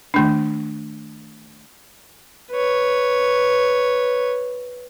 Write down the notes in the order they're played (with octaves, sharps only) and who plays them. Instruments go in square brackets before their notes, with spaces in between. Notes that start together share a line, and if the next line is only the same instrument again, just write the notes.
[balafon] D#3 A3 D4
[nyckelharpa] B4 C#5